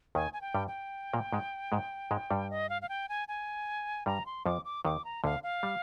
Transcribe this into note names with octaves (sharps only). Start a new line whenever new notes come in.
D#2 D#3 G#5
G#5
G5
G2 G3
G5
A#2 A#3
G#2 G#3
G#2 G#3
G#2 G#3
G2 G3
D#5
F5
F5
G5
G#5
G#5
G2 G3 A#5
C6
F2 F3 D6
D6
D#2 D#3 D6
A#5
D2 D3 F5
F5
G3